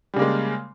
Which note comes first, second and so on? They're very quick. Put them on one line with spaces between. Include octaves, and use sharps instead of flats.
G3 C#3 A#3 G#3